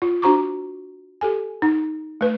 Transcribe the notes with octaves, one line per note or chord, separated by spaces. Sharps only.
F4
D4 F#4 C5 A#5 C#6 D6
G4 A4 G#5
D#4
A3 B4